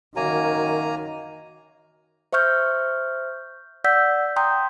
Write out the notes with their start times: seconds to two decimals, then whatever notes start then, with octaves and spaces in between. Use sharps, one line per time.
0.16 F#2 D#3 A#3 F#4 G#5 A#5
2.33 C5 E5 C#6 F6 G6
3.84 D5 F#5 E6 G6 B6
4.36 G5 A#5 C6 D#6 G6